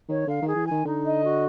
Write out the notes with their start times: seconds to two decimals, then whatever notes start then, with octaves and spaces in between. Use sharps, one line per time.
0.09 D#3 C#5
0.27 D3 F5
0.42 D#3 G#4
0.56 E3
0.66 G#5
0.71 D#3
0.85 D3 D#4
1.04 D#5
1.23 F#4